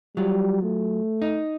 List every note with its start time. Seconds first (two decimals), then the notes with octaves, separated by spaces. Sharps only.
0.17 F#3 G3 F4
0.63 A3
1.22 D#4